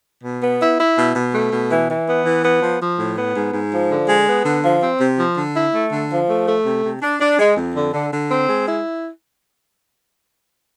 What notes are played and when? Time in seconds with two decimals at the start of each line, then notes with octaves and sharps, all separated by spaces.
0.24 B2
0.42 B3
0.61 E4
0.79 E4
0.98 B2
1.15 B2
1.34 A3
1.53 B2
1.71 E3
1.89 E3
2.08 B3
2.25 E3
2.44 B3
2.62 F3
2.81 F3
2.99 A2
3.17 B3
3.36 G#2
3.54 G#2
3.72 F3
3.91 D3
4.09 G#3
4.27 B3
4.45 D3
4.64 F3
4.82 C4
5.00 C3
5.18 F3
5.37 D3
5.55 E4
5.74 A3
5.92 D3
6.10 F3
6.28 A3
6.47 A3
6.65 C3
6.84 C3
7.02 D4
7.20 D4
7.39 G#3
7.57 F2
7.75 D3
7.94 D3
8.12 D3
8.30 C4
8.48 G#3
8.67 E4